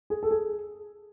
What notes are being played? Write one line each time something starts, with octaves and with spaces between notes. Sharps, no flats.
G#4
A4
G#4